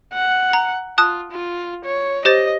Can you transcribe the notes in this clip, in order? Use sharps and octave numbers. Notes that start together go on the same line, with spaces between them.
F#5
A#5
F4 A5 D#6 F#6
F4
C#5
G4 C5 D#5 A6